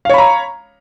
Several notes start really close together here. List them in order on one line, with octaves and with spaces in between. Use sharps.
F5 C#5 B5 A#5